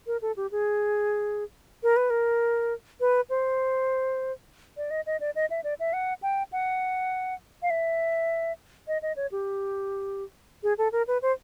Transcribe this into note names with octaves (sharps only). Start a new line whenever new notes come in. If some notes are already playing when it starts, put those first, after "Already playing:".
A#4
A4
G4
G#4
A#4
B4
A#4
B4
C5
D5
D#5
D#5
D5
D#5
E5
D5
E5
F#5
G5
F#5
F5
E5
D#5
D#5
C#5
G4
G#4
A4
A#4
B4
C5